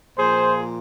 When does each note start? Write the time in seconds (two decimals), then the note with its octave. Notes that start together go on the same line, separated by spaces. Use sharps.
0.18 A#2 F3 G#4 C5